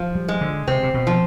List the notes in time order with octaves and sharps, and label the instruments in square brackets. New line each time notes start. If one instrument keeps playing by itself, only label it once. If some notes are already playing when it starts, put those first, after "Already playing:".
Already playing: [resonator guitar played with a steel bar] F3
[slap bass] G3
[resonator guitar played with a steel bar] G#3
[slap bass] D3
[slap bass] C3 [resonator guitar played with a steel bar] C4
[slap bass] C3
B2
[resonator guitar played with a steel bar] F3